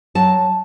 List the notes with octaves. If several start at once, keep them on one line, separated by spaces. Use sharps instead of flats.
F#3 A5